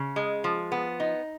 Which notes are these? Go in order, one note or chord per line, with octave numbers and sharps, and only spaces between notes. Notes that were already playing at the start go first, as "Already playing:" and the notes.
Already playing: C#3
G#3
F3
B3
D#4